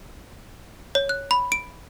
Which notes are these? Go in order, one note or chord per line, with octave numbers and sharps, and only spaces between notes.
C#5
F#6
B5
D7